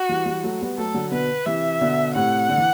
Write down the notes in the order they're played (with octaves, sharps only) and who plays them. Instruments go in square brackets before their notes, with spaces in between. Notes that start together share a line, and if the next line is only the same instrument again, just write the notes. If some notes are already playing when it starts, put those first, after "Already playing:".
Already playing: [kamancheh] F#4
[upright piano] E3 G3
E3 G3
F#3 A3
G3 B3
[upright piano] F#3 A3 [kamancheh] A4
[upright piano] D3 F#3
[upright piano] B2 D3 [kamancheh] B4
[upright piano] C3 E3 [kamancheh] E5
[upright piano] B2 D3
[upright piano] A2 C3 [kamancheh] F#5
[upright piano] D3
E3